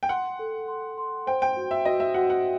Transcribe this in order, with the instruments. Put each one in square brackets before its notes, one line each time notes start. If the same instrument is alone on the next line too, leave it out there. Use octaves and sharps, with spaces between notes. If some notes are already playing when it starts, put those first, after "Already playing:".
[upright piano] G5
[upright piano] F#5 [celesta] C6
[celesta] A4
C6
C6
[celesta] C5 [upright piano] G5
[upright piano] G5
[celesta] F#4
[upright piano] E5
[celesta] F#4 [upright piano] D#5
[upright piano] E5
[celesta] F#4 [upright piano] F#5
[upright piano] F#5